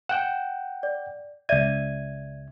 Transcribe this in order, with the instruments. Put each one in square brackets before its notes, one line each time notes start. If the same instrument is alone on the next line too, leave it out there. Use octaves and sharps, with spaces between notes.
[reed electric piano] F#5 G5 [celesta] E7
[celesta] D5
[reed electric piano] C#2 G#6 [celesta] D5 E5 D#7